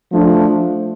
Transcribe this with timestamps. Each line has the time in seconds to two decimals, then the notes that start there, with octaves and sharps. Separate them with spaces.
0.11 F3 A3 D4